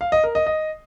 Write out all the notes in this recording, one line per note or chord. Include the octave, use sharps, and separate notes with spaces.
F5
D#5
A#4
D#5
D#5